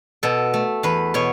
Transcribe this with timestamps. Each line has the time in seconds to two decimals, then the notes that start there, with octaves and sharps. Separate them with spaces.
0.23 B2 A4
0.54 A3
0.83 E2 B4
1.14 B2 C#5